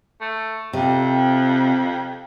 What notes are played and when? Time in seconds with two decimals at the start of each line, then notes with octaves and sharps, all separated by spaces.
0.21 A3
0.73 F2 C3